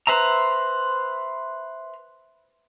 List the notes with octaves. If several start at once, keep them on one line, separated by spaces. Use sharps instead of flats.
B4 C5 E5 A#5